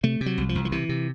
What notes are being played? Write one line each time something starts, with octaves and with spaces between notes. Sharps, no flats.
C3 A3
C3
F#3
C2
F3
C2
F3
C3 E3
C3